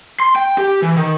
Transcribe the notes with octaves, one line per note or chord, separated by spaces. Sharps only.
C6
G5
G4
E3
D#3